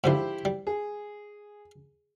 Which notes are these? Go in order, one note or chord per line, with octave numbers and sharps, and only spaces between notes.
G#2 D3 F3 E4 G4 C5
G3
G#4